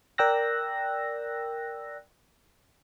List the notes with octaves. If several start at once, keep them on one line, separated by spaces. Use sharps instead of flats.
A#4 D5 G5 E6 F#6 A#6